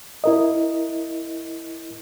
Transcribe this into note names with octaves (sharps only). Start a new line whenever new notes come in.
E4 A#4 D#5